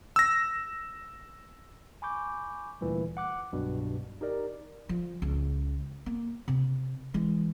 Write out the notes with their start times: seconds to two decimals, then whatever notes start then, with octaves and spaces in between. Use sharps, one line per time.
0.16 E6 A#6
2.02 G#5 B5 C#6 D6 G6
2.81 D2 A#2 E3 G3
3.17 F#5 D6 F#6
3.52 C2 G2 B2 F#3 G3
4.21 D#4 G4 A#4 D5
4.89 F3
5.22 C#2
6.06 A#3
6.48 C3
7.14 E3 G#3